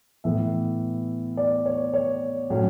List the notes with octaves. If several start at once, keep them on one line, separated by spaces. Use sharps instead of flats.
A2 E3 B3 E5
D5
C#5
C#5
A2 F#3 C#4